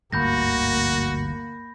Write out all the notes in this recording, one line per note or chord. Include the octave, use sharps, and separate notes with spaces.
G1 D2 G#2 A#3 F#4 B5 G6 A#6